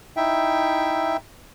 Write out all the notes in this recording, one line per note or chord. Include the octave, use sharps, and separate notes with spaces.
D#4 E4 E5 G5